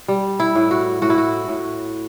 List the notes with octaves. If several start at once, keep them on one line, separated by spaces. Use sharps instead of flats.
G3
E4
A2
F#4
A2 F#4
E4
F#4
A2